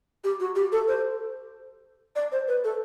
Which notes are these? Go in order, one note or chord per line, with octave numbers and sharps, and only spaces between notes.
G4
F#4
G4
A4
C5
D5
C5
B4
A4